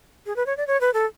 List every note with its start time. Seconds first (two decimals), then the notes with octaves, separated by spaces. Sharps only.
0.26 G#4
0.36 B4
0.46 C#5
0.57 D5
0.67 C#5
0.81 B4
0.94 A4